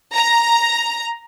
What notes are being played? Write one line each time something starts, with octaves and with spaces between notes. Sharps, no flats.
A#5